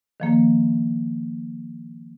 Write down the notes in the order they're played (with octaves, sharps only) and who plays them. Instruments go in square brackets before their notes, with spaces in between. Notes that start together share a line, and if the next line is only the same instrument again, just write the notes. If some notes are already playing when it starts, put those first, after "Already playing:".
[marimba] D#3 F3 A#3